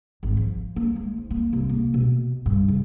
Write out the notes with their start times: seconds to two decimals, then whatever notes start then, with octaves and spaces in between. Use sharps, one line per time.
0.23 G#1
0.37 F3
0.76 A#3
0.96 G#3
1.18 G#2
1.31 A#3
1.53 C2
1.69 A#3
1.94 B2
2.46 G2
2.68 C#3